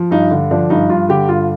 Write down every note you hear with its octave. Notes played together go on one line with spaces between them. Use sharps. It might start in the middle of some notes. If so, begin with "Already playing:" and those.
Already playing: F3
G2 D#4
D3
F3 D4
G2 D#4
G2 F4
D3 G4
G2 F4